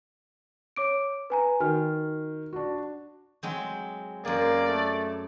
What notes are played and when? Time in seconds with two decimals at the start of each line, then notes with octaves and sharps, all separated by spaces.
0.76 C#5 D6 D7
1.30 B4 G#5 A#5
1.60 D#3 F#4 F6
2.53 D4 F#4
3.43 F#3 G#3 C4
4.25 F#2 A#3 G#4 D5
4.68 A3